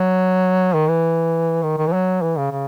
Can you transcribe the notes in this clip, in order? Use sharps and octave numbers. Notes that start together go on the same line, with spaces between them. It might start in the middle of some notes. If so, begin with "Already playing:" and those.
Already playing: F#3
D#3
E3
D#3
D#3
E3
F#3
E3
C#3
C#3